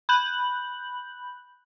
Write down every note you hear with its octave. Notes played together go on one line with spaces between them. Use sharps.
B5 F#6 G6 F#7